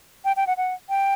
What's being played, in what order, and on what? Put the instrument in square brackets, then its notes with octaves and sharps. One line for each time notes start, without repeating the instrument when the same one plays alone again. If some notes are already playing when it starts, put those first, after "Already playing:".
[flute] G5
G5
F#5
F#5
G5